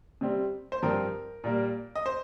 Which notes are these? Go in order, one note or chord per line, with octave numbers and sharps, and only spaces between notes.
C3 G3 C4
C5
G2 F3 C4 A#4
A#2 G3 A#3
D#5
C5